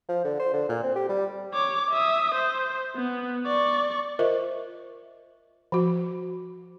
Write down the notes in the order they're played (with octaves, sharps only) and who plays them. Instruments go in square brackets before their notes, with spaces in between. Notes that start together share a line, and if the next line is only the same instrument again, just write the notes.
[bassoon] F3
D3
C5
D3
A#2
C4
G4
G3
[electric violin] C#5 D6
E5 D#6
C5
B3
D5 C#6
[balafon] F4 A#4 C5 D#5 E5
F3 F#4